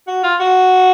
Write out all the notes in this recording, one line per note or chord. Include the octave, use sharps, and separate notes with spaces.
F#4
F4
F#4